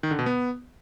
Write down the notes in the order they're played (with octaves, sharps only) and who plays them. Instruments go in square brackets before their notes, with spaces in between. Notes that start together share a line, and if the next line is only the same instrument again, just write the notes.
[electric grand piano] D#3
D3
B2
B3